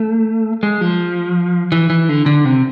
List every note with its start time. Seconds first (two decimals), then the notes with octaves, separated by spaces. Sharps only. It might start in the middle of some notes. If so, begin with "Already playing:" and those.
Already playing: A3
0.63 G#3
0.81 F3
1.72 E3
1.90 E3
2.09 D3
2.26 D3
2.45 C3